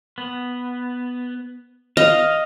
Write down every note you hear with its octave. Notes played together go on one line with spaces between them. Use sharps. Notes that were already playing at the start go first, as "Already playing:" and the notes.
B3
D#5 F5